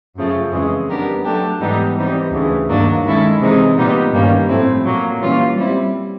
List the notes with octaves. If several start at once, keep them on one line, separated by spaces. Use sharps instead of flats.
F#2 C#3 F3 A3
F2 C#3 E3 G#3
G3 B3 D4 G4 A#4
F#3 A3 D4 G4
G#2 E3 G3 B3 D#4
E3 G3 C4 D#4
D2 C#3 E3
G2 D#3 F#3 A#3 D4
D#3 G#3 C#4 E4 A4
C3 E3 G#3 C4 D#4
A#2 G3 B3 D#4
G2 D#3 G3 A#3 C#4
A2 F3 A3 C4 E4
A#2 F#3 A#3
E3 G3 A#3 C#4 F4
G3 C4 E4